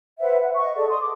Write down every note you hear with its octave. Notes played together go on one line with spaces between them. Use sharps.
B4 C5 E5 F#5
F#5
D#5 C#6
G#4 A4 D5
C6 D#6
D6